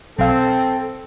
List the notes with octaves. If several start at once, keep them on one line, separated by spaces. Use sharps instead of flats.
B1 C4 A4 F5 G#6